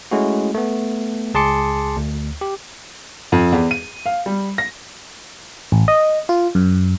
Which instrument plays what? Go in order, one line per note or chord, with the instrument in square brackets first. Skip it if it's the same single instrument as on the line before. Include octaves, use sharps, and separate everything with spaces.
[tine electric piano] G#3 A3 C#4 E4 F#4
A3 B3
C#2 G#4 A5 C6 D6 C#7
D2
G4
[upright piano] F2
E2
D#7
F5
G3
A#6
[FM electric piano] A1
D#5
F4
F#2